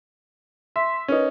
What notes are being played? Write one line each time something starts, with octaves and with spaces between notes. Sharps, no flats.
E5 C6 B6
C#4 D#4 A#4 B4